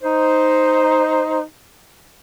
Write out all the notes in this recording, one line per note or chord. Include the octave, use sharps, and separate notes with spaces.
D#4 C5